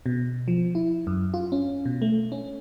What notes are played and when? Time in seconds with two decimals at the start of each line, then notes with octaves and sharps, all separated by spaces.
0.06 B2
0.48 F3
0.75 E4
1.07 F#2
1.34 F4
1.52 C#4
1.85 B2
2.02 A3
2.32 C#4